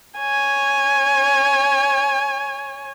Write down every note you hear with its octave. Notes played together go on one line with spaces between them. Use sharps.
C#5 G#5